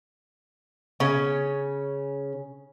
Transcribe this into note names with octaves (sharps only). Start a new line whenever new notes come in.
C#3 C#4